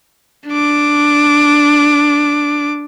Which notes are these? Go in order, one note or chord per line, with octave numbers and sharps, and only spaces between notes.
D4 D6